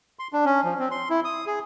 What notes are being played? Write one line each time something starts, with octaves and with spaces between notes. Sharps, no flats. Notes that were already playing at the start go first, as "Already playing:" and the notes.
C6
D4
C#4
F3
C4
C6
E4
D#6
G#4